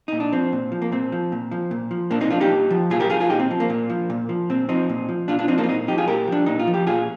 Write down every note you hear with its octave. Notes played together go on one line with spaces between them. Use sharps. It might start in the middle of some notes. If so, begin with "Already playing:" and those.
A#2 D#4
D4
F3 C4
A#2
F3
A#3
A#2 C4
F3
A#2
F3
A#2
F3
A#2 A#3 D4
C4 D#4
F3 D4 F4
D#4 G4
A#2
F3
A#2 F4 G#4
G4 A#4
F3 F4 G#4
F4 G#4
A#2 D#4 G4
C4
F3
A#3
A#2
F3
A#2
F3
A#2 C4
F3 C4 D#4
A#2
F3
A#2 D4 F4
D4 F4
F3 C4 D#4
A#3 D4
F4
A#2 C4 D#4
F3 D#4 G4
F4 G#4
A#2 G4 A#4
F3 D4
A#2 D#4
F4
F3
G4
A#2 F4 G#4